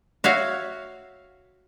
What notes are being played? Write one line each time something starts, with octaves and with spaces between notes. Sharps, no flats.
F#4 C#5 E5 F5